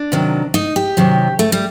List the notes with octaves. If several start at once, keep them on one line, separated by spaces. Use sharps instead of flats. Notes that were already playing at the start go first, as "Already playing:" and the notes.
Already playing: D4
C3 D#3 F#3
D#4
G4
C3 D#3 F#3
A3
G3